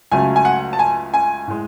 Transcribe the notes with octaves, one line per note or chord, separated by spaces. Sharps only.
C#2 C#3 F#3 A3 G#5
G#5
F#5
A5
G#5
G#5
A2 G#3